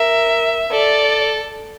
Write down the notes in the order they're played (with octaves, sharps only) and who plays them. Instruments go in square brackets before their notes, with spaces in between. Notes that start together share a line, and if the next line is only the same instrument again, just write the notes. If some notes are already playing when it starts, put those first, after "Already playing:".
Already playing: [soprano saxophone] A#4 [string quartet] E5
[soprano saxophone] A4 [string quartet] D5